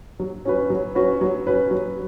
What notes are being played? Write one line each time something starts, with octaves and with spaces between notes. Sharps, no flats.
F#3
C#4 F#4 B4
F#3
C#4 F#4 B4
F#3
C#4 F#4 B4
F#3